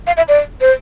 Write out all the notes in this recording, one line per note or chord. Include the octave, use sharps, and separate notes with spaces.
F5
E5
D5
C5